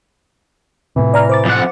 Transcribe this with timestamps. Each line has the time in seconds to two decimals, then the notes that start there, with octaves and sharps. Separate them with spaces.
0.96 A2 C3 E3
1.14 D5 A#5 F6
1.29 C5 D6 A6
1.45 F2 F#5